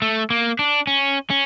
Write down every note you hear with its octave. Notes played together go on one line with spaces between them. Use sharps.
A3
A#3
D4
C#4
C#4